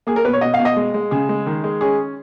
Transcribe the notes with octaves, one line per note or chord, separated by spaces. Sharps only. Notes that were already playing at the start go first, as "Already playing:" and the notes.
A#3 G#4
A#4
B2 B4
C#5
B2 D#5
F5
B2
D#5
G#3
G#3
C#3 G#4
G#3
D#3
G#3
C#4 G#4